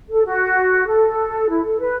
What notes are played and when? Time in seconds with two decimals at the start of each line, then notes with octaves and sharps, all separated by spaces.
0.09 A4
0.25 F#4
0.86 A4
1.48 E4
1.63 A4
1.78 B4